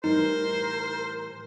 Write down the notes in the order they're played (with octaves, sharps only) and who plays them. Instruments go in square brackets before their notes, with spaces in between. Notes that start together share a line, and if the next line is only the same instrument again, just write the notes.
[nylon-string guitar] A2 E3 G3 [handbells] D#4 [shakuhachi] A#4 [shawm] C5